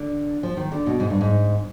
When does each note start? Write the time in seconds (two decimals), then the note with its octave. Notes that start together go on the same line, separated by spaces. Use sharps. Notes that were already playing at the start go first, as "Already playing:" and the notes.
Already playing: D3
0.43 F3
0.57 D#3
0.72 D3
0.86 B2
1.00 G#2
1.10 G2
1.21 G#2